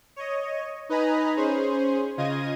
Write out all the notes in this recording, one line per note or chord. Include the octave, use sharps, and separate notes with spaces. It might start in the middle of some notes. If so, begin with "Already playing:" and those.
C#5 D#5
D#4 B4 D#5 G#5 A#5 B5
C#4 G#4 C5
C#3 F4 D#5 G#6 A#6 D#7